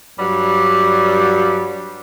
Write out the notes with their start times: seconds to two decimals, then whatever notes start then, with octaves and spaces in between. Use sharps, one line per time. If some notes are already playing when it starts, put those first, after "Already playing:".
0.18 G2 F#3 G3